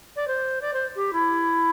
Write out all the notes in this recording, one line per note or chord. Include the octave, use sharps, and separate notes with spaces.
D5
C5
D5
C5
G4
E4